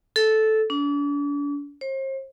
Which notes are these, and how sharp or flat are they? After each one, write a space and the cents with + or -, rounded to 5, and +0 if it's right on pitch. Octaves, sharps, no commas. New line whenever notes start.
A4 -10
D4 -40
C5 +40